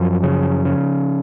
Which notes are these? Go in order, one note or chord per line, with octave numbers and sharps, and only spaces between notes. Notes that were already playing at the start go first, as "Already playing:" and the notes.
Already playing: F#2 F3
C#3
C#3